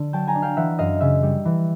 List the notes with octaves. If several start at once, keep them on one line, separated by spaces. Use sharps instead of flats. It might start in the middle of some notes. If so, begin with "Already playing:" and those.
Already playing: D3 D4
F#3 G5 A5
G#5 A#5
D4
F5 G5
E3 E5 F#5
F#2 D#5 F5
C#3 E5
G3
E3